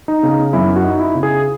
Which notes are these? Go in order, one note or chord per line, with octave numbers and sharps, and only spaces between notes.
D#4
C#3
F#2 E4
F#4
D#4
E4
C#3
G#4